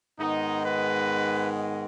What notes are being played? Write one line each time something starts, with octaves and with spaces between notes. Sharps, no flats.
G#2 D#3 G#3 B3 D#4
B4